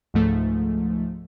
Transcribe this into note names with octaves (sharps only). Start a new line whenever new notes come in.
C#2 G#2 F3 A3